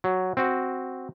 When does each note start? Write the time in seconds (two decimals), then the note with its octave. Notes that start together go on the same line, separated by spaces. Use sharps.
0.04 F#3
0.37 C4 F#4